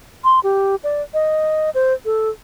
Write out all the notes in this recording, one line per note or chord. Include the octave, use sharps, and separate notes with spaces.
C6
G4
D5
D#5
C5
A4